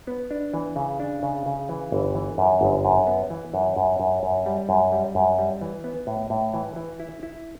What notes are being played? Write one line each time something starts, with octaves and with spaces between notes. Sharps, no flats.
B3
D4
E3
C#3
D4
C#3
C#3
E3
G1
E3
F#2
G1
F#2
B3
E3
F#2
F#2
F#2
F#2
G3
F#2
G3
F#2
G3
E3
B3
A2
A2
E3
E3
E4
E4